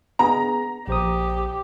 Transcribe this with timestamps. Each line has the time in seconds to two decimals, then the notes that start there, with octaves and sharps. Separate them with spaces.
0.19 B3 G#4 A#5
0.88 A#1 G4 C5 D#6